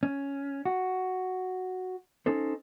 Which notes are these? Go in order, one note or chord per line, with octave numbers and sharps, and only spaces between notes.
C#4
F#4
C#4 D#4 A4 C5